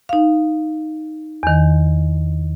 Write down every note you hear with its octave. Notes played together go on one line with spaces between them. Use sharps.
D#4 F5
E2 D#3